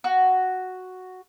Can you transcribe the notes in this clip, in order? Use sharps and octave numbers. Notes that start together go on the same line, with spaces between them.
F#4